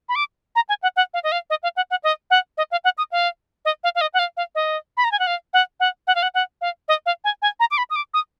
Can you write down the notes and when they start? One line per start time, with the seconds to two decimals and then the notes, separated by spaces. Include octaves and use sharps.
0.09 B5
0.15 D6
0.56 A#5
0.69 G#5
0.83 F#5
0.96 F#5
1.14 F5
1.24 D#5
1.32 F5
1.50 D#5
1.63 F5
1.76 F#5
1.91 F#5
2.04 D#5
2.30 F#5
2.58 D#5
2.72 F5
2.84 F#5
2.98 D#6
3.12 F5
3.65 D#5
3.84 F5
3.95 F5
4.01 D#5
4.14 F#5
4.19 F5
4.37 F5
4.55 D#5
4.97 B5
5.04 A#5
5.12 G#5
5.19 F#5
5.27 F5
5.54 F#5
5.80 F#5
6.07 F#5
6.15 F5
6.23 F#5
6.34 F#5
6.61 F5
6.88 D#5
7.06 F5
7.24 G#5
7.42 G#5
7.60 A#5
7.71 D6
7.78 B5
7.90 D#6
7.96 D6
8.14 D#6